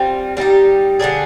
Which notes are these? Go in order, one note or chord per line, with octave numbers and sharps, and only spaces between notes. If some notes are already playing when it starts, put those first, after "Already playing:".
Already playing: G3 C4 F4
G3 C4 D#4 G4
D3 G3 D4 G#4